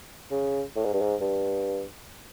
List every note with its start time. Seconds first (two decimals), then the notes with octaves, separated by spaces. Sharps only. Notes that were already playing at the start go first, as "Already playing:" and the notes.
0.31 C#3
0.76 A2
0.85 G#2
0.93 G2
1.02 G#2
1.21 G2